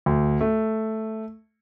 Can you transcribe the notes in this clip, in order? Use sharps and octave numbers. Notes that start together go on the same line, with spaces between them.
D2
A3